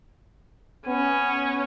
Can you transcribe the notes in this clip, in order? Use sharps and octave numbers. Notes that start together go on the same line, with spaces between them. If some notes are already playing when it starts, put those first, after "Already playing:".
B3 C#4